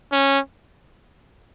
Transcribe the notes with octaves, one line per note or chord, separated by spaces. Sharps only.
C#4